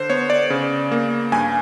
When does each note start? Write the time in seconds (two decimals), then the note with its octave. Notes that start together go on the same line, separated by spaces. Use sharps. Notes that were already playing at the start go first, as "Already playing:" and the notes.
Already playing: D3 C5
0.10 B3 C#5
0.30 D5
0.50 C#3
0.91 A#3
1.32 G2 G#5